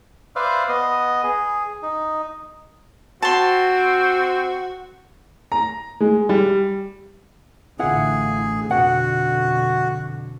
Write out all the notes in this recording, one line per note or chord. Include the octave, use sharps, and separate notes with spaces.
B4 C5 D5 E5 F5
B3 D#5
G#4
D#4
C4 F#4 A5 C6
A#5
G#3
G3
A1 D3 E4 F4 G#4 F#5
F2 B2 D3 F#4 F#5